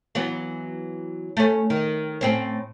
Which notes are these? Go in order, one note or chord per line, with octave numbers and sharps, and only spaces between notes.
E3 F#3 B3
A3 C#4
D#3
A2 C4 C#4